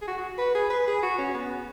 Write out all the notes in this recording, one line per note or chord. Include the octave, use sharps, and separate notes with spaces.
G#4
F#4
F#4
B4
G#4
B4
G#4
F#4
C#4
B3